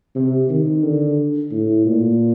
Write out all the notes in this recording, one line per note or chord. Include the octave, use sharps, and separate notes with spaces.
C3
D#3
D3
A2
A#2